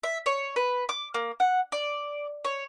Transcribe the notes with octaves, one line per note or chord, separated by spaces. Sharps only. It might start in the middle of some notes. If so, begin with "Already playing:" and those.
E5
C#5
B4
D6
A#3
F#5
D5
C#5